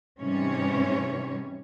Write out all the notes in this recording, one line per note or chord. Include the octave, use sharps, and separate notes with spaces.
G#2 C3 E3 G3 C#4 C#5